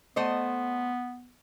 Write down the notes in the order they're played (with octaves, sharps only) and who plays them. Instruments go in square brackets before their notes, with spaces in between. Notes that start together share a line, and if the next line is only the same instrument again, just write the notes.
[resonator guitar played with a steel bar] A3 C5 D#5 [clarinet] B3